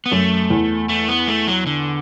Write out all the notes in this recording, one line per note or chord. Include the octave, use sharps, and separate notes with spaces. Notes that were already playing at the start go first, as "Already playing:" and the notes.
B3
F#2 A3
E2
A3
B3
A3
F#3
D3